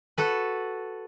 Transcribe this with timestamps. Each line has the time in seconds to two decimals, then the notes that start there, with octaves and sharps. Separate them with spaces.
0.18 F#4 A4 B4